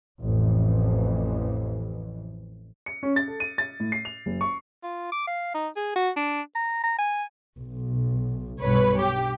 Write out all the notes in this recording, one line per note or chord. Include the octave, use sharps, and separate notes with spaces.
A1 F2 E3
C#7
C#4
A6
A4
D#7
A6
A2
C7
F7
F#1
C#6
F4
D6
F5
D#4
G#4
F#4
D4
A#5
A#5
G#5
B1
B1 G2 B4 C#5
G4